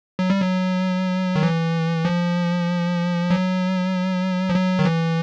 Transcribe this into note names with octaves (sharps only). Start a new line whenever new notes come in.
F#3
G3
F#3
D#3
E3
F3
F#3
F3
F#3
D#3
E3